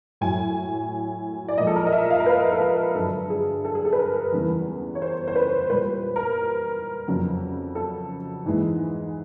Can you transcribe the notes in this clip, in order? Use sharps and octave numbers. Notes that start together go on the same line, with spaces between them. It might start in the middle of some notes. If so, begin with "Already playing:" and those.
A2 F#3 G#5
D5
A#2 F3 G#3 D#5
A4
A#4
D#5
E5
F5
A#4
B4
A4
A#4
G2 D3 F#3 A4
G#4
A4
G#4
A4
B4
A#4
E2 C#3 E3 G3
C#5
C5
C5
B4
A#2 G3 B4
A#4
F2 C#3 F#3
A4
G#2 E3 G#3